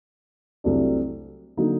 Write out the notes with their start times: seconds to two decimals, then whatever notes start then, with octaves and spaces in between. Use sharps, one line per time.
0.64 C2 C3 F#3 A3 D4
1.57 D3 F#3 A#3 D#4